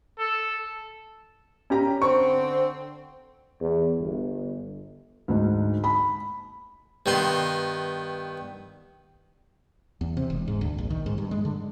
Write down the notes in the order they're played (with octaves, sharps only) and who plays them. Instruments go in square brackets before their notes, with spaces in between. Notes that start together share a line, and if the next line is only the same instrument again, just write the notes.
[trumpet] A4
[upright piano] C#4 G4 A#5
[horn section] D3 C4 [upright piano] C#6
[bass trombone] E2
G1
[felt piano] D2 G#2
B5
[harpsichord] G2 D#3 B3 C6
[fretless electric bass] E2
C3
E1
G#2
D2
A#1
D#3
G#2
G2
G#3
D3